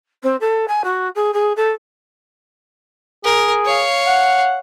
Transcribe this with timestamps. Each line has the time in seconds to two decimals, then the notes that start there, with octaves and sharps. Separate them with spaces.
0.23 C4
0.40 A4
0.68 G#5
0.84 F#4
1.15 G#4
1.33 G#4
1.56 A4
3.25 G#4 A#4
3.65 C#5 F5
4.07 F#5